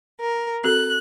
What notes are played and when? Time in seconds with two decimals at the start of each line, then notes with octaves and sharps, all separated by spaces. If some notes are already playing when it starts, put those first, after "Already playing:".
0.19 A#4
0.64 C4 F#4 A4 F#6